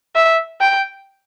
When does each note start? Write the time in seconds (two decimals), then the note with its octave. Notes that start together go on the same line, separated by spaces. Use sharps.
0.16 E5
0.61 G5